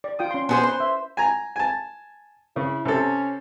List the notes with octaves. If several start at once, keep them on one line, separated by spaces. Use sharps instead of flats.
D5
F4 G5 D#6
C#4 C6
B3 G#4 C5
B4 C5 C6
E5
G#5 A#5
G#5 A5
C#3 E4
C3 C#4 A4